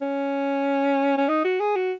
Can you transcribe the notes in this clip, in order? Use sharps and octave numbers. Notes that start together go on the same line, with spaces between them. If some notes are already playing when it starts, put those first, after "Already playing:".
C#4
C#4
D#4
F#4
G#4
F#4